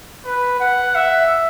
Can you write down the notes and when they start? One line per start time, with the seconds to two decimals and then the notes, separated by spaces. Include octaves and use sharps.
0.25 B4
0.60 F#5
0.95 E5